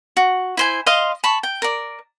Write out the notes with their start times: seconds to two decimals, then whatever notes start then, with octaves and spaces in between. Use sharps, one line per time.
0.17 F#4
0.57 E4 C5 G#5
0.86 D#5 F5 C6
1.24 A5 B5 C#6
1.43 G5
1.62 A#4 D5